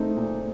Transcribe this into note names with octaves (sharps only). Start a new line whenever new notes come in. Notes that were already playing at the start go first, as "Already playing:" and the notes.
Already playing: A3 C4 D#4
A#2